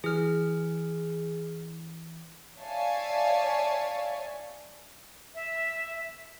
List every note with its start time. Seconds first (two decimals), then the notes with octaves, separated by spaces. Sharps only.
0.04 E3 G#4 F6
2.60 C#5 D5 E5 F5 G#5 A5
5.35 E5